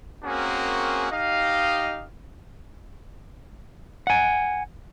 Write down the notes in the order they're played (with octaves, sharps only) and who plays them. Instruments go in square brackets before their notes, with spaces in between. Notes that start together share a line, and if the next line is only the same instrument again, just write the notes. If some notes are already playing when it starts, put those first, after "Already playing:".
[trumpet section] A#3 C4 C#4 F#4 G#4 A#4
D#4 G4 D#5 F5
[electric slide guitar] F#5 G#5